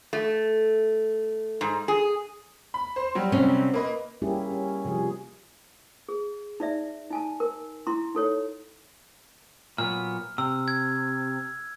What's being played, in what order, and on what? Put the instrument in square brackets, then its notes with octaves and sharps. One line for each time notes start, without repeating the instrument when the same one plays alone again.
[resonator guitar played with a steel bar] A3
G#2
G#4
[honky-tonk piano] B5
C5
F#3 G3
[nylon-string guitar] C3 C#4
[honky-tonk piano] A#3 B4 D#5
[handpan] G3 A#3 C#4 E4 G4 G#4
C#4
C3 F3 G3 G#4
[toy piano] G#4
D#4 D5 E5
D#4 G#5 A5
A#4
E4 A#5 C6
D#4 A4 C#5
[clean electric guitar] A#2 F#3 B3 [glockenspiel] F6
[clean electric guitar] C3 [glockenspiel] E6
[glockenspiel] G#6